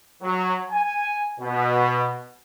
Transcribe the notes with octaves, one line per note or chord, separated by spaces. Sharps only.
F#3
G#5
B2